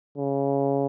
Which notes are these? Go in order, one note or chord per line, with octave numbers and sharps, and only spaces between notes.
C#3